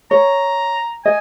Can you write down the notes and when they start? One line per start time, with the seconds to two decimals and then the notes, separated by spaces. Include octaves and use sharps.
0.11 C#5 A#5
1.05 D#5 G#5